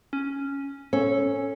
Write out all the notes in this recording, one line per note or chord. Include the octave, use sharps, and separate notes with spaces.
C#4
C#4 A4